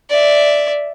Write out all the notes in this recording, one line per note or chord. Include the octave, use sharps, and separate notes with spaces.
D5 E5